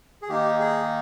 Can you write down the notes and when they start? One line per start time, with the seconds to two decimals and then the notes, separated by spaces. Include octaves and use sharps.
0.22 G#4
0.28 D#3 A#3 D#4 G4
0.60 G#4